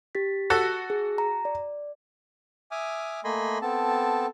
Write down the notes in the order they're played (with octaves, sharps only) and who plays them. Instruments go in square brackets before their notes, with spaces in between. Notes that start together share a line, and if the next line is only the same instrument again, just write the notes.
[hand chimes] G4 A6 B6
[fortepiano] F#4 A4
[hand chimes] G#4
A#5
D5
[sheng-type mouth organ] E5 G#5 D6 D#6 F6
A3 A#3 D#5 G#5 B5 C6
B3 C4 A4 A5